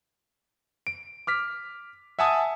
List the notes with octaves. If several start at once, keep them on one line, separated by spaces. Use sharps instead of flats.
D7
D6 F6 B6
E5 F#5 G#5 A5 D#6